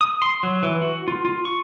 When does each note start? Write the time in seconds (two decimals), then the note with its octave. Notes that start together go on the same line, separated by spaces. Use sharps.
0.01 D#6
0.22 C6
0.43 F#3
0.63 E3
0.82 F#4
1.08 F4
1.25 F4
1.45 C#6